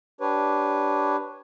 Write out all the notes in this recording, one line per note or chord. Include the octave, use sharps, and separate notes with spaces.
D4 G4 B4 C#5